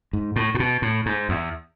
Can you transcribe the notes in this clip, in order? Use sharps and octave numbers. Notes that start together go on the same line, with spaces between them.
G#2
A2
A2
B2
A2
G#2
E2